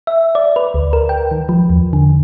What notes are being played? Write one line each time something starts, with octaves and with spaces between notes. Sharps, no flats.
E5
D5
B4
D2
A#4
G5
D#3
F3
E2
D3